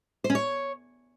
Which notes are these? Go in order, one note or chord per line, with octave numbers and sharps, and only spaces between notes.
C5
C#4
C#5